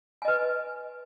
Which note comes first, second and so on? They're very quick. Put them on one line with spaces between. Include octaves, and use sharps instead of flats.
G#5 D#5 B4